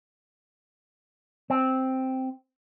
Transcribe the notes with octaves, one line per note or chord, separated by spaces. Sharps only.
C4